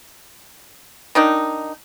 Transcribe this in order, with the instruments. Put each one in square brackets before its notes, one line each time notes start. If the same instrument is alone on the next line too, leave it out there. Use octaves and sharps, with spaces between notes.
[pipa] D#3 D4 D#4